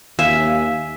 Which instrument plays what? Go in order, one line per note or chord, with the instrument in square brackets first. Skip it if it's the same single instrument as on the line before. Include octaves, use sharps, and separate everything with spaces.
[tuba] D#2 [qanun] E5 [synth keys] F5 G#5